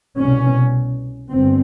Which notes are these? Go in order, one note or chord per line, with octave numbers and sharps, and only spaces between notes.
C2 B2 C#4
G1 C4